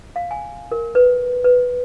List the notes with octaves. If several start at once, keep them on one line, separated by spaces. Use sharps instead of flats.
F5
G#5
A#4
B4
B4